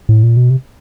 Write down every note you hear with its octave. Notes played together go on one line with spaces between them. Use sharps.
A2
A#2
B2
C3